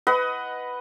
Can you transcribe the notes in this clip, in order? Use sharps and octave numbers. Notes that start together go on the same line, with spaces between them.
B4 D#5 F#5